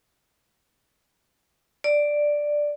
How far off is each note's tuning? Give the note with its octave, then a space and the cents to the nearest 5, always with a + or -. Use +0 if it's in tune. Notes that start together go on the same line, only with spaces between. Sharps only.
D5 +5